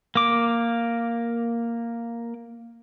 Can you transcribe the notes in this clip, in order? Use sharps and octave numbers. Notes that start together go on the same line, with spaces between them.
A#3 D6